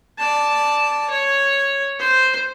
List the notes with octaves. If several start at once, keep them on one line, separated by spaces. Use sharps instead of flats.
D5 A5
C#5
C5